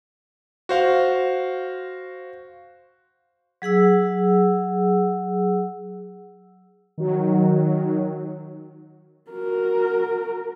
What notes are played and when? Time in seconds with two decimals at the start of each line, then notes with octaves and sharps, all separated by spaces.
0.69 F#4 C5 F5
3.62 F#3 G#4 F#5 E6
6.98 D#3 F#3
9.31 F#4 A#4